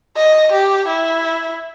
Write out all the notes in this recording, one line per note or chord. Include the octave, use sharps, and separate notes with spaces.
D#5
G4
E4